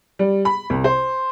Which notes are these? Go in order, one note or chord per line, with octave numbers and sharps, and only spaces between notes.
G3
B5
C2
C5